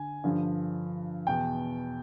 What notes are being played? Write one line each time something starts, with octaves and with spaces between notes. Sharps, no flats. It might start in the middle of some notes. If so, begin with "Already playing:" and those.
Already playing: D3 G#5
G2 D3 F3
E2 B2 G5